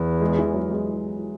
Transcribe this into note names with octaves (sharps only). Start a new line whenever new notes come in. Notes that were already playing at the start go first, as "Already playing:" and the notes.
Already playing: E2
G#3
E3
F#3
G#3